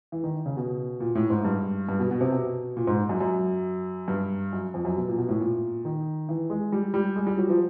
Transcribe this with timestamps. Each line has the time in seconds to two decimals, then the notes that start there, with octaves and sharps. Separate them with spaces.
0.12 E3
0.24 D#3
0.46 C#3
0.57 B2
1.00 A#2
1.15 A2
1.30 G#2
1.45 G2
1.89 G2
1.99 B2
2.11 B2
2.21 C3
2.32 B2
2.77 A#2
2.87 G#2
3.09 F#2
3.20 F#2
4.08 G2
4.53 F#2
4.74 F2
4.85 F#2
4.96 B2
5.08 A#2
5.18 B2
5.29 A2
5.40 A#2
5.85 D#3
6.29 E3
6.50 G#3
6.72 G3
6.94 G3
7.16 G#3
7.27 G3
7.38 F#3
7.49 F3